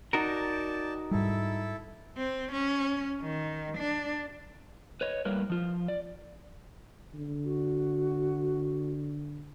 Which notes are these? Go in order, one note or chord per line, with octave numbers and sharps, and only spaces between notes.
D#4 F#4 A#4 D5 G5 A5
G#2 G3 E4 A4
C4
C#4
D#3
D4
B4 C#5 D#5
A2 G3 A3 A#3 A#4 B4
F3 F4
D5
D3
F#4